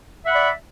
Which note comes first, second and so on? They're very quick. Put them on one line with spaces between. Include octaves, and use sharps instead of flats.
E5 F#5 B5 D5